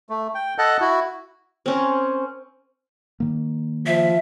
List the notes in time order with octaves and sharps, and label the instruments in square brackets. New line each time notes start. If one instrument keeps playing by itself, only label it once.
[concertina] A3
G5
A4 D#5 F#5 A5 F#6
E4 F#4
[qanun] C4 C#4 A#4
[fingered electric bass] D#3 A#3
[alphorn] F3 [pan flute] E5